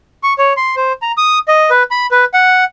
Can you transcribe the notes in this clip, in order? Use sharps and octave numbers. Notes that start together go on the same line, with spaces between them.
C#6
C#5
C6
C5
A#5
D#6
D#5
B4
B5
B4
F#5